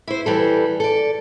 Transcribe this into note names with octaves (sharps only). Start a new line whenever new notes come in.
E4 C5
E3 G3 A4
A4 D5